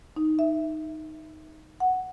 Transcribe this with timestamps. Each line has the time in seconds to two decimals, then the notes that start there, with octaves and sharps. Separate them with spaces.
0.16 D#4
0.39 E5
1.80 F#5